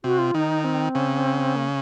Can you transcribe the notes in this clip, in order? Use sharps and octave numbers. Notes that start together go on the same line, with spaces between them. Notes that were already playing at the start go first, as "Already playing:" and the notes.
C3 F#4
F4
D#3 D#4
C4
C#3
A#3